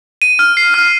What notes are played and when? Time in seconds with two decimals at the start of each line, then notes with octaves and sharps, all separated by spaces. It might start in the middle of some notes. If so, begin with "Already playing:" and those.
0.22 D#7
0.39 F6
0.57 C7
0.74 F6